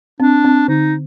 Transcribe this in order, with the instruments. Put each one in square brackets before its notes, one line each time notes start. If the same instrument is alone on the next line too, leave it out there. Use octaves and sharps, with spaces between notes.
[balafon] C4 [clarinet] D4
[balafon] C4
[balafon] D3 [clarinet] D#4